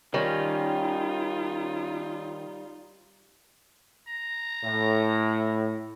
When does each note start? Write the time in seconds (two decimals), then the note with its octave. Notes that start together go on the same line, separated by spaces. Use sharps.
0.14 D#3 G3 C#4 D#4 F4
4.08 A#5
4.64 A2